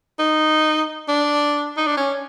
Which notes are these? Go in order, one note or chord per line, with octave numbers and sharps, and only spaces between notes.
D#4
D4
D#4
D4
C#4